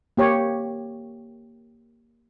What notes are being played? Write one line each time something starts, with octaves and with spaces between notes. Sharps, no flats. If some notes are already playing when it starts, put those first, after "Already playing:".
A#3 G4 C#5